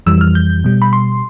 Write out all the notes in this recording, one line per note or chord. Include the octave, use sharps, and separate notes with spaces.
F2 E3 G3 E6
F6
G6
B2 G3
B5
C6